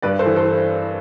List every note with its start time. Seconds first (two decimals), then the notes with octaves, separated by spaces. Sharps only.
0.02 G2 B4 D5
0.19 A4 C5
0.26 E3
0.36 A4 C5